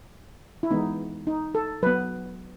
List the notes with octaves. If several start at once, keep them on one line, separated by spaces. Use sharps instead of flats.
E4
E3 G#3 B3 D#4
D#4
A4
F#3 B3 B4